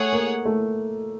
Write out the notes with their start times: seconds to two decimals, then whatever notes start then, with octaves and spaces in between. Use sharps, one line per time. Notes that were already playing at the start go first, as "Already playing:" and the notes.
Already playing: A3 G#4 C#5 F#5
0.13 A#3
0.46 A3